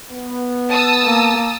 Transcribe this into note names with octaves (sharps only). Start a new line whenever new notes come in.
B3
A5 D#6 E6
A#3